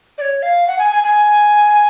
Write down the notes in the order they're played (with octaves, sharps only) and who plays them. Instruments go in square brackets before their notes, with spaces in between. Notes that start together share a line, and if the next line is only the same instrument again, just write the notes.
[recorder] D5
C#5
F5
F#5
G#5
G#5
G#5